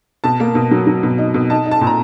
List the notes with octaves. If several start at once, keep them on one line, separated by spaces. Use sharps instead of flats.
B2 A5
A#3
B2
F#3
F#3
B2
D#4
B2
D#4 A5
D#4
A5
A#2
A#5